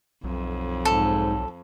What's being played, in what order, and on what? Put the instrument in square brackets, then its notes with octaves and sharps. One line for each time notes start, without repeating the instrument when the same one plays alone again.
[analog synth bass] B1 [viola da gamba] F2
[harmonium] G#2 [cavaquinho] A4